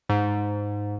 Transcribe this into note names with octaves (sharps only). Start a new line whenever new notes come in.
G#2